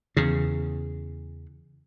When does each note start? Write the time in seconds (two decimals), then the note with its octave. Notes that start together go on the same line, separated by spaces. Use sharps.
0.17 E2 C#3